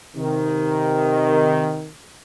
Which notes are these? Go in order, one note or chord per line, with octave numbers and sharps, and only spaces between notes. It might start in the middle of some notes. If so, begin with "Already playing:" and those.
C3 D#3